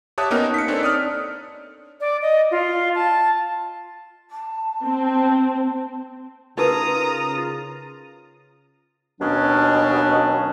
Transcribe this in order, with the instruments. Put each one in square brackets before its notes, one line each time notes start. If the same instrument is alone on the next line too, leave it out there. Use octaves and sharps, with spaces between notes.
[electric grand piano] G4 C#5 E5 A5 D#6 F#6
A#3 B3 C#4 D#4 A#4
B6 C#7
C4 D4 D#4 A4 C#5
D5 D#6 F6
[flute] D5
D#5
F4
A5
[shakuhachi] A5
[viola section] C4
[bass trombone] C#3 [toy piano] D#4 A#4 B4 [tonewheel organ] F4 [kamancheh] A#5 D#6
[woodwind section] D#2 B2 F#3 C#4 D4